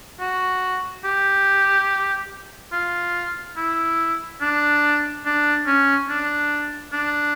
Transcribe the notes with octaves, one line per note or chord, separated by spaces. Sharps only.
F#4
G4
F4
E4
D4
D4
C#4
D4
D4